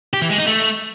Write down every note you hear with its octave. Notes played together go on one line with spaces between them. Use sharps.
G4
E3
G#3
D#4
A3